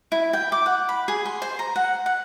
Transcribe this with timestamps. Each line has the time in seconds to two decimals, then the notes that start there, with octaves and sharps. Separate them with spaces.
0.12 E4
0.33 G5
0.52 D6
0.66 F#5
0.89 B5
1.08 G#4
1.26 C6
1.42 C5
1.59 A#5
1.76 F#5
2.06 F#5